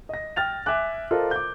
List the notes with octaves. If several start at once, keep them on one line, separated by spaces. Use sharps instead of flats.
D#5 A#6
G5 F6 A6 F7
E5 G#5 D6 F#6
F4 A4 A#4 C5 D#5
D6 G6